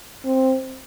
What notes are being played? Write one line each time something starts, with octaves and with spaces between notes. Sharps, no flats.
C4